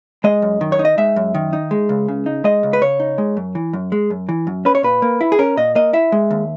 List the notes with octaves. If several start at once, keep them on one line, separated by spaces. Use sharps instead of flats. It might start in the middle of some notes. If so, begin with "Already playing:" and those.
G#3 D#5
F#2
D#3
C#5
D#4
D#5
G#3 E5
F#2
D#3
D#4
G#3
C#2
C#3
D#4
G#3 D#5
C#2
B4
C#3 C#5
D#4
G#3
F#2
E3
F#2
G#3
F#2
E3
F#2
C#4 B4
C#5
A#2 B4
A#3
E4
G#4
C#4 A#4
A#2 D#5
A#3 D#5
E4 E5
G#3
D#2